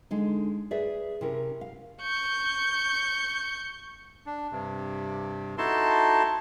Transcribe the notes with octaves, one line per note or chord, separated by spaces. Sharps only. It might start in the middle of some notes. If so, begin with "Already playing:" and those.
D3 G#3 D#4
G#4 B4 D5 E5
C3 C#4 E4 A#4
F5
C#6 G6
D4
G2 C3
D#4 E4 F#4 A4 A5 C6